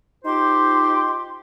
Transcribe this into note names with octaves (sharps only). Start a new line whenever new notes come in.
D#4 F4 G4 C5 C6